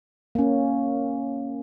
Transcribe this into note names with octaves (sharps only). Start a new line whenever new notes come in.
A#3 C#4